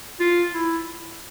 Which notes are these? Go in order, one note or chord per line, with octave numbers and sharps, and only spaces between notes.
F4
E4